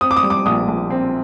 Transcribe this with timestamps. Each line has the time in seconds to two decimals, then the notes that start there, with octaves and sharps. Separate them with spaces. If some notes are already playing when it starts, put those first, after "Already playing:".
0.01 C4 D#6
0.11 D6
0.17 D#6
0.23 G3
0.30 D6
0.46 A#1 D#6
0.68 A#1
0.90 C4